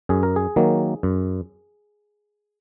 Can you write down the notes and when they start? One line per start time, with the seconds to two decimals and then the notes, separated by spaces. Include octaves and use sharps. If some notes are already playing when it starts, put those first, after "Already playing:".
0.09 F#2 G#4
0.23 A#4
0.36 G#4
0.56 D#3 F#3 A#3
1.03 F#2